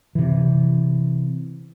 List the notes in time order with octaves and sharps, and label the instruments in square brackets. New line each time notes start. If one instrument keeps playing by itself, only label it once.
[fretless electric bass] C3 E3